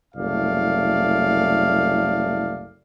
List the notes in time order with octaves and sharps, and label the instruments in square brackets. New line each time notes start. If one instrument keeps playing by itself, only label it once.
[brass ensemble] F#1 C2 A3 D5 F5